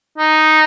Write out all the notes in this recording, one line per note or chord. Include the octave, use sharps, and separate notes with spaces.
D#4